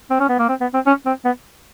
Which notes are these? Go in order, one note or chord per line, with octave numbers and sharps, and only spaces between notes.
C4
C#4
B3
A#3
C4
B3
C4
C#4
C4
B3